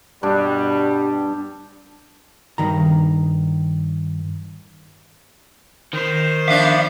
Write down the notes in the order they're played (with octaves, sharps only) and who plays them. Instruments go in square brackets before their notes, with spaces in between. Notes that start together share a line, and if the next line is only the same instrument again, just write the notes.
[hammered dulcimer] G2 D4 [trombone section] B2 G3
[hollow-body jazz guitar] G2 D#3 A#5
[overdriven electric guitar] D#3 [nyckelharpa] C5
[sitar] F3 B3 D4 [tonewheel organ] E5 F5 D6